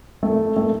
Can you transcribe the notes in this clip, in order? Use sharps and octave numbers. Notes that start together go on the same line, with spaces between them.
A3
A3